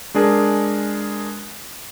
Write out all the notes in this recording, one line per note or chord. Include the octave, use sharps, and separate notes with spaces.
G#3 D4 G#4 A#4